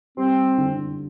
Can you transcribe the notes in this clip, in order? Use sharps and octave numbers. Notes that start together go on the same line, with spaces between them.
G3 C4
D3